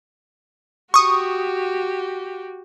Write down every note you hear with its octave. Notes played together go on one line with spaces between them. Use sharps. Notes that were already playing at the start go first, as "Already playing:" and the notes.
F#4 G4 C#6 D#6